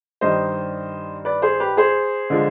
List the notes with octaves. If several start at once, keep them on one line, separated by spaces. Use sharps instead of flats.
G2 D#3 G3 C5 D#5
B4 D5
G#4 C5
G4 B4
G#4 C5
D3 F3 G#3